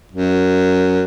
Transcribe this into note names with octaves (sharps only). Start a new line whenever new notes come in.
F#2